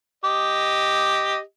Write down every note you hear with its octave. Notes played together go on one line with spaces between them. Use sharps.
G4 D#5